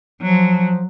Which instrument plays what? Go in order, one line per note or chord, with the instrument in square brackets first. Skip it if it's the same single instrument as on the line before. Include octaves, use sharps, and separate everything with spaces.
[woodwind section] F3 [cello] F#3